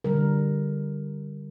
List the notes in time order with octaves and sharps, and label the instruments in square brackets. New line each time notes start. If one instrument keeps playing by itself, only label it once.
[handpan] D3 G3 A#4